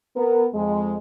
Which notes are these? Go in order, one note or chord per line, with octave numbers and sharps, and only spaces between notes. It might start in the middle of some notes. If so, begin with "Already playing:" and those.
B3 A#4
F2 G#3